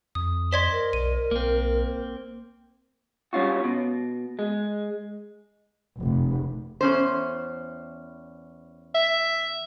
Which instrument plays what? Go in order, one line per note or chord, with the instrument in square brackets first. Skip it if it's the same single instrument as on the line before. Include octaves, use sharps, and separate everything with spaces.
[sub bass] F2 [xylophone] D#6
[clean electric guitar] C5 D5 D#5 [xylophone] C6 G#6 B6
[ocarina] A#4
[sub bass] B1 [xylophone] D#7
[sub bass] B1 [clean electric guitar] A#3 C4
[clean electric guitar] G3 C#4 F4 F#4
B2
G#3
[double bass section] F1
[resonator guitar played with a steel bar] E2 C#4 C5
[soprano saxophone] E5